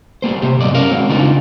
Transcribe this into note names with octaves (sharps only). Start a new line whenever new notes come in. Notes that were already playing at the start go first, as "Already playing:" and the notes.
G3 A#3 C5
C3 G4
B1 G2 D5 D#5
C#4 A#4 F5
G#3 C4 F#4
C#3 D4 D#4 F4